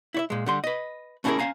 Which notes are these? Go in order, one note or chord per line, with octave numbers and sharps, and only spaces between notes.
E4 C#5 E5
A#2 G#3
D3 G3 C6
B4 D#5
A3 C#4 E4 F4 G#4 A#4
C#4 C5 F5 G#5 A#5